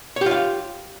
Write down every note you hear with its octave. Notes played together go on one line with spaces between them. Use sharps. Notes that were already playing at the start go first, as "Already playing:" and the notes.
F4 G4 C#5 F5